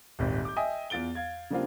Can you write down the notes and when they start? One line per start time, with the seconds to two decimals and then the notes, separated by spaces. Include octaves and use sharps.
0.19 D#1 G#1
0.45 D6 G6
0.56 D#5 E5 G5 G#5 D#6
0.90 E2 F4 A6 D7 G7
1.15 F5 G#6
1.50 C#3 G3 A#3 C4 D4 F4